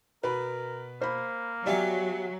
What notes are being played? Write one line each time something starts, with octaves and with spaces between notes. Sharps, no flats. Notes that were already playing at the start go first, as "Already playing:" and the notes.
B2 A#4 B4 B5
A#3 C5 B5
F#3 G3 B3 D5 E5 F5 G#5